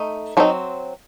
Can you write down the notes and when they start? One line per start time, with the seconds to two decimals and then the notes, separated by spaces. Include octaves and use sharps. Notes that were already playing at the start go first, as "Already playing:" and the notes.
Already playing: A3 D#4
0.37 F#3 C4 D#4 F#4 A4